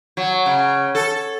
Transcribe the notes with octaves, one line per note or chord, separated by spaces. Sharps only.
F#3
C#3
A4